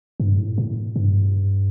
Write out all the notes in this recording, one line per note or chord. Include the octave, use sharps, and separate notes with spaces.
G2
A2
A2
G2